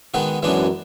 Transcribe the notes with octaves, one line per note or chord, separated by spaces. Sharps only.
D#3 G#3 B3 D#4 F#4
F#2 E3 G#3 B3 D4 F#4